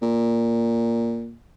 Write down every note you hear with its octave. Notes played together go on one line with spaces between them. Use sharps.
A#2